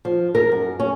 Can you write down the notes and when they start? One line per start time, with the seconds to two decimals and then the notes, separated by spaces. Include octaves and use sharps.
0.05 F3
0.35 A#4
0.52 F#2
0.80 C#4